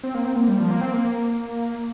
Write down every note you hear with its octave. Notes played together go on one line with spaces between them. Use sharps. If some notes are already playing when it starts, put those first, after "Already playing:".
C4
A#3
C4
A#3
G3
F3
A#3
C4
A#3